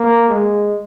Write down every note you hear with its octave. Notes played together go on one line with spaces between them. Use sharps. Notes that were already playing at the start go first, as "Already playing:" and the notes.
Already playing: A#3
G#3